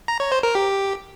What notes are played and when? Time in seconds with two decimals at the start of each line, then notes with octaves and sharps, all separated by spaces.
0.08 A#5
0.20 C#5
0.32 C5
0.43 A#4
0.55 G4